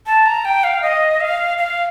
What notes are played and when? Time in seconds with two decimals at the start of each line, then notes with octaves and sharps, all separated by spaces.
0.06 A5
0.26 A#5
0.45 G5
0.64 F5
0.82 D#5
1.21 F5
1.58 F5